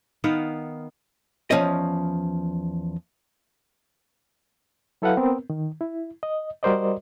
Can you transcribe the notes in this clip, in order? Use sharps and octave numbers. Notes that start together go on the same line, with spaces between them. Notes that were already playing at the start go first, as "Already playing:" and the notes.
D#3 B3 F5 F#5
E2 D#3 F3 C#4 D#5
F#3 E4 A4 B4 F5 F#5
B3 C4 A#4
D#3
E4
D#5
G3 F#4 A#4 C5 D5 D#5